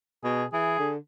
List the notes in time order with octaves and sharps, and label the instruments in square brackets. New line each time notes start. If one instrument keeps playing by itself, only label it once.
[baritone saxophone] B2 [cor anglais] G#4
[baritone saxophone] E3 [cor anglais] G#4
[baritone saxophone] D3